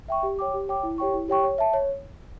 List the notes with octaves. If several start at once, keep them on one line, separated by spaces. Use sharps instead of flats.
E5 G5 C#6
G4
C#5 G5 D6
G4
C#5 G5 D6
E4
G4 C#5 G5 C#6
E4
G4 C#5 G5 C#6
C#5
E5 A5
C#5